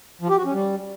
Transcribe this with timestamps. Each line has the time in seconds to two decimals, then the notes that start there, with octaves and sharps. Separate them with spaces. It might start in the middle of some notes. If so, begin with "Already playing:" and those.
0.21 F3
0.29 G4
0.37 F#4
0.45 C#4
0.53 G3